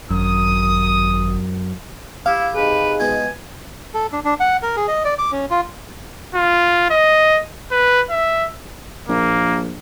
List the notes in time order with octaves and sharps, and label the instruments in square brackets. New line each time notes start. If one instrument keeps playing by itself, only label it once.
[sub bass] G#1 [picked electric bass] F#2 [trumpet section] D#6
[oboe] E4 [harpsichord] G4 [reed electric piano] F5
[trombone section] C3 D#4 G#4 [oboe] B4
[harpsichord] B2 F3 G#3 [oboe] G#5
[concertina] A4
D4
D4
F#5
A#4
G#4
D#5
D5
D6
C#4
F4
[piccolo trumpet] F4
D#5
B4
E5
[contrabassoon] A#1 [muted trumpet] A#3